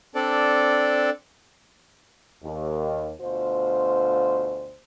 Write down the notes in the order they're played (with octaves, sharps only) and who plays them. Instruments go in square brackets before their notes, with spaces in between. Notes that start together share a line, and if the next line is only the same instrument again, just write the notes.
[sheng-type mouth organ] C4 D4 A4 D5
[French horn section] D#2
D2 B2 F4 C5